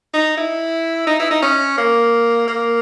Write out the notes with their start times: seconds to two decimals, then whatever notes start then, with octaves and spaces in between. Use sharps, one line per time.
0.13 D#4
0.37 E4
1.07 D#4
1.19 E4
1.31 D#4
1.42 C#4
1.77 A#3
2.47 A#3